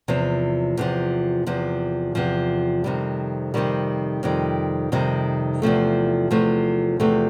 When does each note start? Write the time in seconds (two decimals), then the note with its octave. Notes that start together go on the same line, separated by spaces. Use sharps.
0.08 E2 C3 F3
0.77 E2 C3 F3
1.47 E2 C3 F3
2.15 E2 C3 F3
2.84 F2 C3 D#3 G3
3.54 F2 C3 D#3 G3
4.23 F2 C3 D#3 G3
4.92 F2 C3 D#3 G3
5.62 E2 C3 F3 A3
6.31 E2 C3 F3 A3
7.00 E2 C3 F3 A3